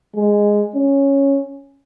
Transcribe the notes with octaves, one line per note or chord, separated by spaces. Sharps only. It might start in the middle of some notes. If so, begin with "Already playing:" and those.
G#3
C#4